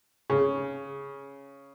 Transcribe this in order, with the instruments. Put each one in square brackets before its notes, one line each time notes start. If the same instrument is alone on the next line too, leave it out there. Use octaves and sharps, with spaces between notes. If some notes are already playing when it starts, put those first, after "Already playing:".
[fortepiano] C#3